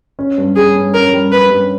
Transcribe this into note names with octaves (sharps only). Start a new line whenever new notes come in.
C#4
G2
G3 G#4
G2
C#4 A#4
G3
C#4 B4
G2